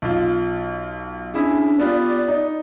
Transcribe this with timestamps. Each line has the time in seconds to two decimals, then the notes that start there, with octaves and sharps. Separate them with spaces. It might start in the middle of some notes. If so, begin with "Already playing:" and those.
0.02 B1 F4
1.34 C#4 D4 E4 G#4
1.80 B3 F4 G4 D5
2.28 D#4